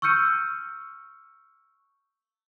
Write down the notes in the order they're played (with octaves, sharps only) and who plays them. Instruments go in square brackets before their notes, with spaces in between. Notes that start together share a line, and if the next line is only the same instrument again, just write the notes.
[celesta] C#6 E6 F6 G6 C#7 D#7